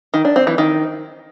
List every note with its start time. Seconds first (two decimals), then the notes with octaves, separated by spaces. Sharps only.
0.14 D#3
0.25 D4
0.36 C4
0.47 E3
0.58 D#3